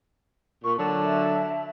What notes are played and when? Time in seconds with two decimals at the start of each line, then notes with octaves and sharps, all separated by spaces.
0.64 A#2 C#6
0.78 D3 F#3 A5
1.04 E5